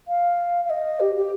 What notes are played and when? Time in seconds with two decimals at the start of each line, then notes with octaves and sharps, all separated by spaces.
0.08 F5
0.65 F5
0.70 D#5
1.00 G4
1.15 G4